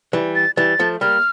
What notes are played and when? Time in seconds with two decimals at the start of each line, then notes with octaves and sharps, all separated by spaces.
0.13 E3 G3
0.35 A6
0.57 E3 G3 A6
0.80 F3 A3
1.01 G3 A#3 F6